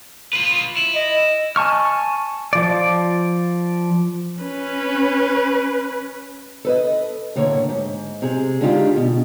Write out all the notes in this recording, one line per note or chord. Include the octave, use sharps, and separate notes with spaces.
F4 B4
E4
D#5
G#5 A5 C#6 F6
F3 D5
C#4 B4
A4 B4 D#5
A2 D3 A#3 C#5
G#2
C3 G#4
D3 G#3 D4 D#4 F4 G4
B2